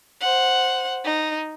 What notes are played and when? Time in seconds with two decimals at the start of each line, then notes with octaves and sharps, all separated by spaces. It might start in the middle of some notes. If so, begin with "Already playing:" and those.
0.21 C5 F#5
1.04 D#4